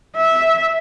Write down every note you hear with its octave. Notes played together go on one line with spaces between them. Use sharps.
E5